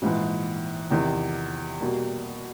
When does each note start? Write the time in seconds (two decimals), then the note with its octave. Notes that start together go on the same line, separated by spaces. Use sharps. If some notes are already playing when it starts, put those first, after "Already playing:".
0.02 A#1 G#2 E3
0.91 E2 C3 D#3
1.80 B2 G3 A#3